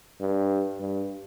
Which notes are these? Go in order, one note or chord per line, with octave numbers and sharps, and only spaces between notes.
G2
G2